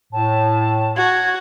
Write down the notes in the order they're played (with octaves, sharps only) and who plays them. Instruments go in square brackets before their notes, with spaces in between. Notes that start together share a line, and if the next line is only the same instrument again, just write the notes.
[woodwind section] A2 [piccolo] A5
[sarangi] F#4 [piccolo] G#6